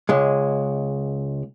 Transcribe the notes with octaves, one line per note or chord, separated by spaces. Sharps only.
C#2 G#3